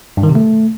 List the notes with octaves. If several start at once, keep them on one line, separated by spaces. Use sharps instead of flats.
G2
D#3
C3
A3